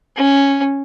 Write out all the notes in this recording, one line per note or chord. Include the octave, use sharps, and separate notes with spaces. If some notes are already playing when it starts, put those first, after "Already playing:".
C#4